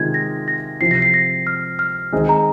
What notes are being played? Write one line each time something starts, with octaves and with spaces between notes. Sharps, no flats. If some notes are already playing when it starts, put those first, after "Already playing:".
Already playing: C3 D#3 G#3 F4 G#4 G#6
A#6
A#6
C3 F3 C4 C7
A#6
C7
A#6
F6
F6
D#3 G#3 C4 D#4 G#4
A#5